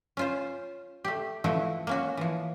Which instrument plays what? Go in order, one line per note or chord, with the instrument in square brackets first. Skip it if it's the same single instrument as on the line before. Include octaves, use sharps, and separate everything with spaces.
[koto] C#4 F4 C5
A3 G4
E3 F3 A3 E4 F#4
A#3 C#4 F#4
E3 F3